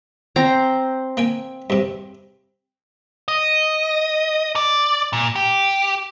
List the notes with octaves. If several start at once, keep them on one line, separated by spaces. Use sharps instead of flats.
C4 C5 A#5
A#3 G5 G#5
G2 C3
D#5
D5
A#2
G4